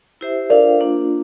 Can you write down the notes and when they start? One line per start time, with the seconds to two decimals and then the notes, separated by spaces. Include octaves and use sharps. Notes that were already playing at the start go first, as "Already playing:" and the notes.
0.21 E4 G4 C5 E5
0.50 D4 F4 A4 A#4 C5 D5 F5
0.80 A#3 D4 F4